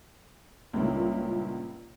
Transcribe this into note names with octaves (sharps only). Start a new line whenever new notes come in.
C#2 G2 A#2 C#4 E4